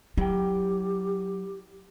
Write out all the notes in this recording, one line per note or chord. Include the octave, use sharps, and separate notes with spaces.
F#3 E4 G4 G5